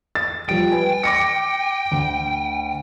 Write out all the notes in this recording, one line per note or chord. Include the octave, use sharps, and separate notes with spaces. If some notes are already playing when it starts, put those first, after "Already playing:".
A6
F3 G3 G5 D7
B4 G#5
D6 A#6 C#7
D2